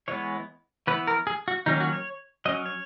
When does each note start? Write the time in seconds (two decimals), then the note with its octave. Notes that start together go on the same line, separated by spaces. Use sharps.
0.08 E3 G#3 B3 C#5
0.87 E3 B3 B4
1.07 A#4
1.27 G#4
1.48 F#4
1.66 D#3 F#3 A#3 C#4 D#4
1.80 F#4
1.93 C#5
2.45 F#3 C#4 D#5
2.66 C#5